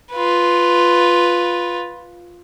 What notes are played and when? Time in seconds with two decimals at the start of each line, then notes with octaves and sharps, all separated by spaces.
0.13 F4 B4